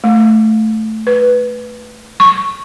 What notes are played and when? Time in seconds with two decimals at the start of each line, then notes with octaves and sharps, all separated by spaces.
0.04 A3
1.07 B4
2.20 C#6